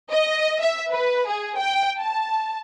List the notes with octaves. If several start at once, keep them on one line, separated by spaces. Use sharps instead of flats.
D#5
E5
B4
G#4
G5
A5